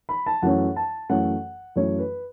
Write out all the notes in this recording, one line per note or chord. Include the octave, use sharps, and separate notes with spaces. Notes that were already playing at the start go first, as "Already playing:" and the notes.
B5
A5
F#2 E3 A3 C#4 F#5
A5
F#2 E3 A3 C#4 F#5
F#2 E3 A3 C#4 C#5
B4